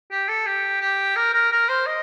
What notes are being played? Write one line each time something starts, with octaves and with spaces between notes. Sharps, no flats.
G4
A4
G4
G4
A#4
A#4
A#4
C5
D#5